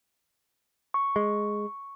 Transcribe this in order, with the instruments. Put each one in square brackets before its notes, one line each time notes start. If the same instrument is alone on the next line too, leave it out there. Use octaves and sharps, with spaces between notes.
[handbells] C#6
[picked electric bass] G#3